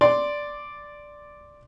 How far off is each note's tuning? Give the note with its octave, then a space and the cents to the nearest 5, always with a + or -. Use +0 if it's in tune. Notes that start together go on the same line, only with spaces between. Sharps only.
D5 +0 C6 +0